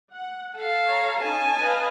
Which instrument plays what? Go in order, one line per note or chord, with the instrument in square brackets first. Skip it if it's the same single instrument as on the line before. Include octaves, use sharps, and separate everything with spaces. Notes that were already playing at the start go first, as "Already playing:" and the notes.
[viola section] F#5
[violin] A4 F5
[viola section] C#5 A#5
[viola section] C#4 D#4 [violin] G#5 A5
[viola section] B4 D#5 F5